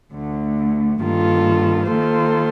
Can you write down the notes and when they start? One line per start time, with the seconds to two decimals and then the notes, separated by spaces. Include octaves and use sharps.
0.13 D2 D3 A3
1.01 G2 D#3 A#3 F4 A4
1.88 D#3 A#3 F4 A4 C5